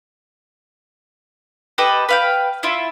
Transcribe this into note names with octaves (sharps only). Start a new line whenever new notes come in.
G4 A4 B4 D#5
B4 F5 G5
E4 F4 E5